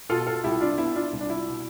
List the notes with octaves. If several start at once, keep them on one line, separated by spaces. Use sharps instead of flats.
B2 F4 A4
F4 A4
C2 E4 G4
D4 F4
B3 E4
D4 F4
C2
D4
E4
B2